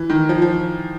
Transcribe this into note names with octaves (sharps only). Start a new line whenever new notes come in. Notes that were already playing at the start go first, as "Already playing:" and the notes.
Already playing: E3
D#3
F3
F3